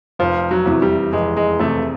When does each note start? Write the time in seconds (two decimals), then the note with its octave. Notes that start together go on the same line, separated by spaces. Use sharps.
0.19 F1 F3
0.51 F#3
0.66 E2 C3 E3
0.82 G3
1.13 F1 G#3
1.36 G#3
1.60 E2 C3 E3 A3